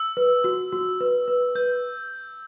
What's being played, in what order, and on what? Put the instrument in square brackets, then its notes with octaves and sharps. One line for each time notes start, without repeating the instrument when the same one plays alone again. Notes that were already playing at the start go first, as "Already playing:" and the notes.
Already playing: [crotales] E6
[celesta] B4
F#4
F#4
B4
B4
[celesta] B4 [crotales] G6